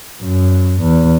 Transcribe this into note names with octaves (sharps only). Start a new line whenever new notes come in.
F#2
E2